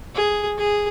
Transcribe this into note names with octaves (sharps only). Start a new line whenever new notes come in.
G#4
G#4